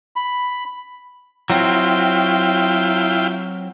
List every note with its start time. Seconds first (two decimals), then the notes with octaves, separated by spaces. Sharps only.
0.16 B5
1.50 F#3 C4 E4 F4 G5